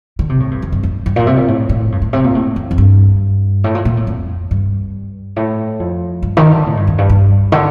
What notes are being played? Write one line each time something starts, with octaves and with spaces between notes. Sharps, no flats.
D3
C3
A2
G2
F2
G2
F2
G2
A#2
C3
A#2
A2
A2
G2
A2
C3
A#2
A2
F2
F2
G2
A2
A#2
A#2
A2
F2
G2
A2
F2
G2
D#3
D3
A2
G2
F2
G2
G2
D3